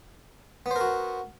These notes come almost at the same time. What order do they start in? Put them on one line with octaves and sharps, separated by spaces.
B3 C5 A#4 F#4